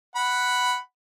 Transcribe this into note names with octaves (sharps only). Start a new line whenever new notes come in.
F#5 B5